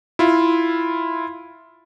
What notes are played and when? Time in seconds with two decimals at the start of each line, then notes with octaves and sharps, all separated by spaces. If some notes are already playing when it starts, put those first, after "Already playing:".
0.19 E4 F4